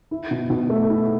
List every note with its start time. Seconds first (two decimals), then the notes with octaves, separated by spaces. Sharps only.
0.11 E4
0.31 B2
0.50 B2
0.70 A3
0.90 E4